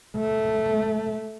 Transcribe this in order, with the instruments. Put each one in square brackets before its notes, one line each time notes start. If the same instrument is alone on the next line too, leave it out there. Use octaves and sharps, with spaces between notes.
[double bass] A3